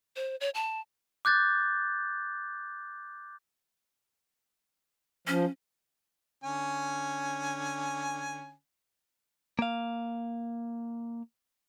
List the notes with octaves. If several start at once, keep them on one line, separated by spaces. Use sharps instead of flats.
C5
C#5
A5
D6 F#6 G6 A6
F3 C#4
D3 C#4 G#5
A#3 F5